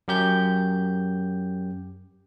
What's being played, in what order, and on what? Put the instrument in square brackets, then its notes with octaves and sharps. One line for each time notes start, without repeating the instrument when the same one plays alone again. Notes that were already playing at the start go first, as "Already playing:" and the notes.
[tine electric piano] F#2 G4 G6